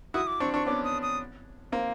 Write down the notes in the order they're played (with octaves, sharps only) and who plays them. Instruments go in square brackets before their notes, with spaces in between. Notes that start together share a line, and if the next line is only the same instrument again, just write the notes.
[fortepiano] E4 F#4 [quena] D#6
[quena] D6
[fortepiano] C4 D4 [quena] C#6
[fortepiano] C4 D4 [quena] C#6
[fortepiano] B3 C#4 [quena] D6
[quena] D#6
D#6
[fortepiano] A#3 C4